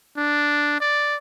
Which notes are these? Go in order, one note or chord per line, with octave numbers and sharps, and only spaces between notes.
D4
D5